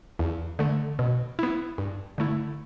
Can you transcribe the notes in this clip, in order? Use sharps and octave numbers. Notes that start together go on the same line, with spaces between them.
E2
D3 A3
B2
B3 E4
G2
D3 A3 E4